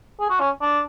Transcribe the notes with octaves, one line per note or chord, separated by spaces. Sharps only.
G#4
F#4
C#4
D4